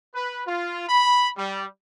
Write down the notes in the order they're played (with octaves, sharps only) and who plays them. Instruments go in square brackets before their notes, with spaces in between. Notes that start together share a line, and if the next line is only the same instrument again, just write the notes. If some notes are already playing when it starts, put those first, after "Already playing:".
[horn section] B4
F4
B5
G3